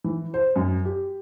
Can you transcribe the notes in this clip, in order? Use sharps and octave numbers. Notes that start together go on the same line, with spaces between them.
E3
C5
F#2
G4